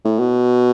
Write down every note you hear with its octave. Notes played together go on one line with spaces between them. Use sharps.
A2
B2